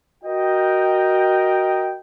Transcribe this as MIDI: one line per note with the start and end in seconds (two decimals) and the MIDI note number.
0.24 1.97 66
0.24 1.97 70
0.24 1.97 75
0.24 1.97 79